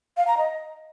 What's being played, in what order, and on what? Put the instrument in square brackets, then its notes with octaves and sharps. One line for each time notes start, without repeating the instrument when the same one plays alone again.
[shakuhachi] F5
A#5
D#5